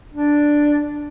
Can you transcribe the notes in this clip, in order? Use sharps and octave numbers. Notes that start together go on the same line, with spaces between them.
D4